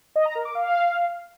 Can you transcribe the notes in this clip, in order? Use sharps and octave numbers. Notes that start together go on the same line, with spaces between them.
D#5
A#5
A#4
D6
F5